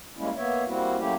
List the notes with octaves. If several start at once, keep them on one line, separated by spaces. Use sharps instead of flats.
G3 G#3 A#3 C#4 E4
A#3 B3 C#5 E5
G3 A#3 C4 E4 F#4
F#3 A3 A#3 C#4 E4 G4